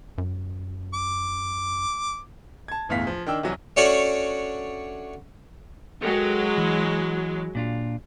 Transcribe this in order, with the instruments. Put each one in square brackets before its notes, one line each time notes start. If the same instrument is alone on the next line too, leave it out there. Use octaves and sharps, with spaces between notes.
[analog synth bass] F#2
[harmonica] D6
[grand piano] A5 G#6
G1 E2 A2 F5 B6
F3
D#3 D4 G5 E6
C2 E3 F#3
[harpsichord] A3 C#4 D4 F#4 C#5 D5
[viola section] F#3 G#3 [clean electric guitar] A4 A#4 G5
[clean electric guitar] E3
A#2 D4 F4